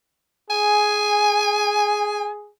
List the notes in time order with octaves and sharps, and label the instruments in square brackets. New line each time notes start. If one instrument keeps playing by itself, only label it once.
[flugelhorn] G#4 [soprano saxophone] G#5